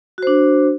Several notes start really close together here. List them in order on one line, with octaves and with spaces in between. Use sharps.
F#4 C5 D4